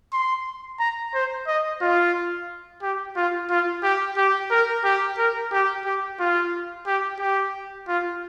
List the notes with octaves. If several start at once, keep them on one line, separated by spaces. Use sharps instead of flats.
C6
A#5
C5
D#5
F4
G4
F4
F4
G4
G4
A#4
G4
A#4
G4
G4
F4
G4
G4
F4